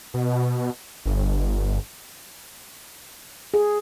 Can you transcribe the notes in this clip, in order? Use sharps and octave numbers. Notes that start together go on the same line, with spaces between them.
B2
G1
G#4